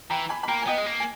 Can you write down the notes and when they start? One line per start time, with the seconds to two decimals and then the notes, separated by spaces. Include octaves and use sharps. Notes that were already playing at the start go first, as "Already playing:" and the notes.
0.10 E3 G5 A#5
0.29 G#5 B5
0.43 B5
0.48 A#3 G5 A#5
0.62 G#5
0.67 B3 D#5 G5
0.78 G#3
0.86 A#3
1.00 G#5